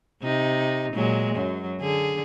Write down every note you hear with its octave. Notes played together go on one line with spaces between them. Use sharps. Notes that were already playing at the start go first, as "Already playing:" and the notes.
C3 D#4
A#2 F#3 G#3
F#2 F#3
D3 G#4